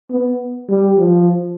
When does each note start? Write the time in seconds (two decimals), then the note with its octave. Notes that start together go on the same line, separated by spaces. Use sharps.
0.11 B3
0.69 G3
0.98 F3